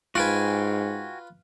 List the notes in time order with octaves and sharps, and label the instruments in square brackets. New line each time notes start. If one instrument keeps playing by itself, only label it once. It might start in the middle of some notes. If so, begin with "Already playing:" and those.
[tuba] G#2 [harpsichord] F4 B4 [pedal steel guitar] F#4 G5 G#5